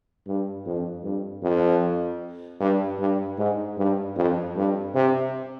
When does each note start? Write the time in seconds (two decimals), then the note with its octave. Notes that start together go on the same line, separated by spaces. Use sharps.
0.27 G2
0.66 F2
1.04 G2
1.43 F2
2.60 G2
2.99 G2
3.38 G#2
3.78 G2
4.16 F2
4.56 G2
4.95 C3